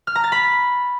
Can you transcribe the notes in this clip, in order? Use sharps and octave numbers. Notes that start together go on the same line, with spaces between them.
F6
A#5
A6
B5